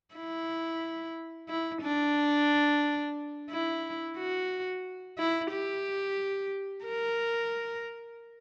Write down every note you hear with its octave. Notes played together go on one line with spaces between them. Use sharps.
E4
E4
D4
E4
F#4
E4
G4
A#4